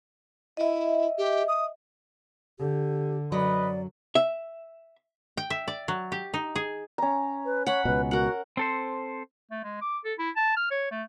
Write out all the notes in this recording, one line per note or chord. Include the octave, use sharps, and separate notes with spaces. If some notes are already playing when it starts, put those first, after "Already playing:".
E4 D#5 E5
G4
D#6
D3 G4
F#2 F#3 B4 D5 D#5 B5
E5
G5
E5
D5
F#3
G4
D#4
G#4
C#4 A#5
B4
C#5 F#5 B5
C#2 B2 B4
F#4 A#4 F#5
C4 A4 C5
A3
G#3
D6
A4
E4
A5
F6
C#5
A3